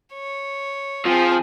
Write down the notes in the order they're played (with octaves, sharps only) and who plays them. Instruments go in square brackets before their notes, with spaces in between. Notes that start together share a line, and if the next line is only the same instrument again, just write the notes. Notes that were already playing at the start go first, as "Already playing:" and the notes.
[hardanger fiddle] C#5
[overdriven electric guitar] F3 [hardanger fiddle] C4 G#4